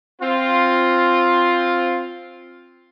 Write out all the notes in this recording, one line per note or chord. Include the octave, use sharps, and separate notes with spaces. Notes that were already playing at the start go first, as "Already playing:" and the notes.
C4 F4